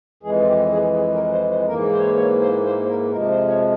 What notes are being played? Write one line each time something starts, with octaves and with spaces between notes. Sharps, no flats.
F2 E3 G#3 G#4
F4
G4
G#4
G#4
A#4
C5
C5
G#2 E3 A#3 A#4
C5
C#5
C5
C#5
C5
C5
C5
A#4
F2 C3 F3 G#3 A#4
C5
C#5